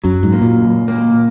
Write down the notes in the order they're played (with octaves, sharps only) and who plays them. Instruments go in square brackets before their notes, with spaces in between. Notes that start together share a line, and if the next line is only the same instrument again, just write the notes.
[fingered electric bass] F#2 [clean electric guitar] F#3
[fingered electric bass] G#2
[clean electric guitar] A#3
[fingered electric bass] A#2
[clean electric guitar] C#2
A#3